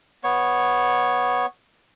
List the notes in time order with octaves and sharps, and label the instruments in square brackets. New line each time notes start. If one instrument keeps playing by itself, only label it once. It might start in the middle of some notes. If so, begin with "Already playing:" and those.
[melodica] B3 C#5